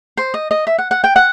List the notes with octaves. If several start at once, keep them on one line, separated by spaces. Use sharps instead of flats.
C5
D#5
D#5
E5
F#5
F#5
G5
F#5